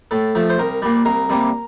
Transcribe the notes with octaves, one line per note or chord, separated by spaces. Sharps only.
A2 A4
F3 A3
C5
C2 A#4
A#2 G3
C2 A#4
C3 G3 A#3